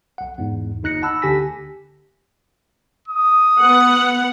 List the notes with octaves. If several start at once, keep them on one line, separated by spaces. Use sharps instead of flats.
B1 F#5
E2 G#2
G1 D#2 D#4 F#6 A#6 C#7
F#5 A5 B5 E6
D2 D3 G4 G#5 A#6 B6
D#6
B3 F#5